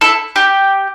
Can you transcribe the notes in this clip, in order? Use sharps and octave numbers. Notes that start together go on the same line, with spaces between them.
E4 A4
G4